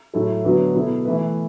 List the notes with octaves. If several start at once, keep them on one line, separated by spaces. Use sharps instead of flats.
A2 F#3 A3 E4 A4
D3 F#3 B3 F#4 B4
B2 B3 E4 A4
E3 A3 E4 B4